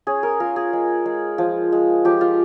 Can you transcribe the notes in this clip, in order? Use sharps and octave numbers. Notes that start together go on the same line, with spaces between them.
C#4 G#4
A#4
F4 A#4
G#4
G#3
G#3
F3
G#3
F3 G4
F4